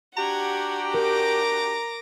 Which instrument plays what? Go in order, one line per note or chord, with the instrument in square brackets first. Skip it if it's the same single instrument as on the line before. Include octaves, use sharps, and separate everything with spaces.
[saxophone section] D4 F#4 G4 [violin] F#5 G#6 [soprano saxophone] A#5
[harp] A#4 [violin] D6 A#6